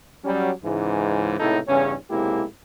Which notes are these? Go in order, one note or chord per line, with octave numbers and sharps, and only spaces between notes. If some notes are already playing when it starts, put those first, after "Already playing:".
F#3 G3 C#4
C#2 G#2 E3
C#2 A2 C3 D#4 E4 A4
E2 G2 C#3 C#4
B1 C3 G#3 A#3 E4 G4